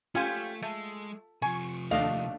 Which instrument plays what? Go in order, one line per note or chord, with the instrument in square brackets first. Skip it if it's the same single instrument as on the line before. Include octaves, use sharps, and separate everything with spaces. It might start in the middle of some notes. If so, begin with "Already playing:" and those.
[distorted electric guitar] A3 [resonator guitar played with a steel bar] C#4 G4 [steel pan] F4 G#5
[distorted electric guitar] G#3 [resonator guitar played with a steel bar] A3
[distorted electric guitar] C3 F3 [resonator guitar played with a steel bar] G#5 [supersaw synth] C#6
[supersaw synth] D#2 A3 D4 [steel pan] D#5 [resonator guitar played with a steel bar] F5